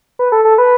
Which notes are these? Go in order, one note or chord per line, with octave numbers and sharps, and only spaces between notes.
B4
A4
A4
B4